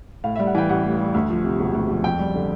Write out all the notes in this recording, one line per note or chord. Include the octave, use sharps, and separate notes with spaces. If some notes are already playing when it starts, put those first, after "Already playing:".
A2 F5
E5
G3
F#5
E3 G5
A1 F#5
A2
G3
D2
F3
C3
E1
D2
F3
F2 G5
G3
D3